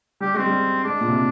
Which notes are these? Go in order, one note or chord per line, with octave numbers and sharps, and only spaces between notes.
G3 G4
G#3 C4
G3
G#3 D4
A#2
C3